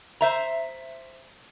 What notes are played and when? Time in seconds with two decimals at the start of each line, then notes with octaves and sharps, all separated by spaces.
0.21 C5 E5 A#5